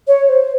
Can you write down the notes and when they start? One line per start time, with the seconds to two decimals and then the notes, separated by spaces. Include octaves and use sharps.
0.07 C#5
0.28 C5